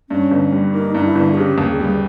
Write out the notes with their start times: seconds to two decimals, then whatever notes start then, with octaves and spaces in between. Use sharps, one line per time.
0.10 G2 C#4
0.31 G1
0.53 G3
0.73 A#3 D#4
0.95 G2 D#4
1.06 E4
1.16 G1
1.33 G#4
1.37 C#3 G4
1.58 D#2
1.69 G#4
1.80 G3